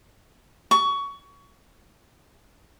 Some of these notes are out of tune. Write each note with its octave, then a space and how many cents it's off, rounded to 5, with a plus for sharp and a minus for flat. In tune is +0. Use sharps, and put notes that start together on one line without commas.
C#6 +20